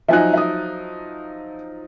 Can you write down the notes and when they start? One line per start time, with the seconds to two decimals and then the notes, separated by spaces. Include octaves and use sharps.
0.08 F3 F#3 D#4 E5 G#5 F#6
0.33 E5 D#6